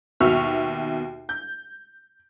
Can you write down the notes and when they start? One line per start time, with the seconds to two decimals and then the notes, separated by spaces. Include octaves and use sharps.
0.20 D#2 B2 F#4 E5 C#6 F6
1.29 G6